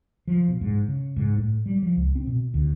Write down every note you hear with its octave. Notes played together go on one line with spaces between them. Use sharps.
F3
B2
G#2
C#3
G#2
A2
G3
F3
C#2
C4
B2
D2